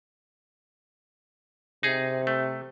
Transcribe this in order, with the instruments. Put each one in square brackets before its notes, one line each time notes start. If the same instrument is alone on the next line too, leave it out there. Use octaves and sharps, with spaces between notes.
[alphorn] C3 [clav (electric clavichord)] D#4 G#4
[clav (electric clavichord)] A3